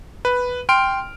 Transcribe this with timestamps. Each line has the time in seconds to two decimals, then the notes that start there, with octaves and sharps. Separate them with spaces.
0.25 B4
0.69 G5 C6 F6 D7